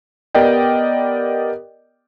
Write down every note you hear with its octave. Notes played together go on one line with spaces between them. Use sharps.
B3 G4 A#4 D5 D#5 G5